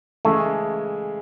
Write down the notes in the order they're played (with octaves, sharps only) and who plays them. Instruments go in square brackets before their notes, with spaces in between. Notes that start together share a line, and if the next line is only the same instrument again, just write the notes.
[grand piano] C#3 E3 G#3 [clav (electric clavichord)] A3